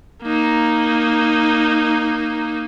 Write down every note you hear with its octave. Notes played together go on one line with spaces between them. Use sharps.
A#3 D#4